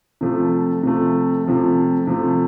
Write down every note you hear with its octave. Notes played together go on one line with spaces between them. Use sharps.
C3 F3 A3
C3 F3 A3
C3 F3 A3
C3 F3 A3